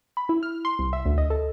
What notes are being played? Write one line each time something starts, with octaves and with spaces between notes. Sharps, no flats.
B5
E4
F6
C6
C2
E5
D2
D#5
A4